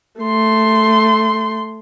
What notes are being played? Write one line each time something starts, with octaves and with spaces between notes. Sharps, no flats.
A3 C6